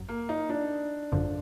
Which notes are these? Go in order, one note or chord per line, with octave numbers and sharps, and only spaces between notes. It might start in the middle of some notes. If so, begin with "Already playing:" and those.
Already playing: G#1 F#2 F#3
A#3
D#4
D4
G#1 F#2 D3 F3